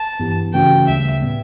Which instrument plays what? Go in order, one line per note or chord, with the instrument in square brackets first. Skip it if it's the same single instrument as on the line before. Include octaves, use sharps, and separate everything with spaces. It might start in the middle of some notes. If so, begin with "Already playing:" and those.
Already playing: [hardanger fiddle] A5
[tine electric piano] G2 E3 B3 E4 G4
[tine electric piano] C#3 E3 A3 C#4 F#4 [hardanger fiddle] G5
[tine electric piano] D2 C#3 G3 [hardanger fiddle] E5
[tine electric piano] A2 G3 B3